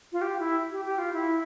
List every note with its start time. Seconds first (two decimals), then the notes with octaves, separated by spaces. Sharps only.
0.13 F4
0.22 G4
0.39 E4
0.72 G4
0.85 G4
0.99 F4
1.13 E4